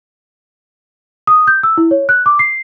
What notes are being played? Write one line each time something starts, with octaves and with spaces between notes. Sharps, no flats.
D#6
G6
E6
E4
C#5
F#6
D6
C7